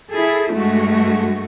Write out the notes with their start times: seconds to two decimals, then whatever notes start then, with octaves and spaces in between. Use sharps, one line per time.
0.11 E4 G#4 A4
0.54 G2 G#3 A3 F#4